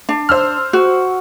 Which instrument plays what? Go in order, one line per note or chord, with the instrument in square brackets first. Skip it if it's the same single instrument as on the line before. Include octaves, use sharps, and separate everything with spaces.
[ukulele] D4
[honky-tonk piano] C5 E6 F6
[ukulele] F#4